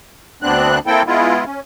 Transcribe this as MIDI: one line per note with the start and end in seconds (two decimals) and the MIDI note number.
0.42 0.79 38
0.42 0.79 59
0.42 0.79 60
0.42 0.79 62
0.42 0.79 90
0.87 1.03 58
0.87 1.03 60
0.87 1.03 64
0.87 1.03 69
0.87 1.03 79
1.07 1.44 56
1.07 1.44 59
1.07 1.44 64
1.07 1.44 65
1.45 1.60 61